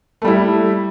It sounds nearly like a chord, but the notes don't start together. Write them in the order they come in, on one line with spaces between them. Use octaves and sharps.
A3 G3 E4